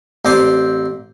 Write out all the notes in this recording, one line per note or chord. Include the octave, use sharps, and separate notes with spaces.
A1 C4 D5 C6